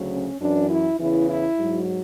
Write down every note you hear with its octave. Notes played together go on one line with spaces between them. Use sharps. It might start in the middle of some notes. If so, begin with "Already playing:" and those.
Already playing: D2 C#3 F#3
C#4
F#2 E3 D4
E4
E2 C#3 E3 E4
E4
G#2 F#3